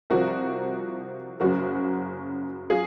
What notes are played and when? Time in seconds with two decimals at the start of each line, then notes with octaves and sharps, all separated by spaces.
0.10 C2 C3 F3 F#4 A#4
1.40 F#1 F#2 C#3 F#3 F#4 A#4
2.70 F#3 F4 G#4